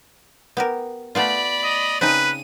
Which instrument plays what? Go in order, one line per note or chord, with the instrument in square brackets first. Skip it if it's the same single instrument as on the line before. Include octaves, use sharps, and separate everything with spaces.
[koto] B3 G4 A#4
[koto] A3 B3 F4 [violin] D5 B5
[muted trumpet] D#5
[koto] C#3 C4 D#4 [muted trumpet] B4 [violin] D#7